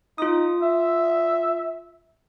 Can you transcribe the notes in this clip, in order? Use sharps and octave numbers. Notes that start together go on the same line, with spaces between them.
D#4 F4 D#6
E5